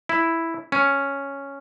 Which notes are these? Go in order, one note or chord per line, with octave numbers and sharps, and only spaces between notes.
E4
C#4